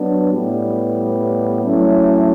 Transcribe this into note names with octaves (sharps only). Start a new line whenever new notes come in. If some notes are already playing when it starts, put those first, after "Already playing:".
Already playing: F#3 B3 D4
A2 G3 B3
F#3 A3 C#4 E4